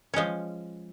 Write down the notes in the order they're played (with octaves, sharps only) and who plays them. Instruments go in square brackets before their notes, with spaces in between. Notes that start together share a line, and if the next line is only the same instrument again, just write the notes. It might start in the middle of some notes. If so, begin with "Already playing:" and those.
[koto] F3 G#3 C#4